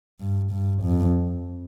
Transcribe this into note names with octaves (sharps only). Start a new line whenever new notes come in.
G2
G2
F2